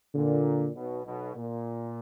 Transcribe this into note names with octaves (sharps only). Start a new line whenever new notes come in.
A#2 D3
B1 B2
B1 B2
A#2